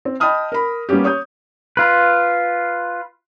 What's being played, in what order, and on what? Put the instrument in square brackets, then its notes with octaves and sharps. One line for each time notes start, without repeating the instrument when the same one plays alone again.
[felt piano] C4
D#5 G5 A5 B5 D#6 F6
A#4 B5
G3 A#3 B3 C#4 G4
C#5 D#6 G6
[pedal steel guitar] F4 B4